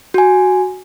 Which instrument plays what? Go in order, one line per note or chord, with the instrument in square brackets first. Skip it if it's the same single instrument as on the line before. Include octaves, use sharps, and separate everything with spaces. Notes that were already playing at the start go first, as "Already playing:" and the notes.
[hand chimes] F#4 G#5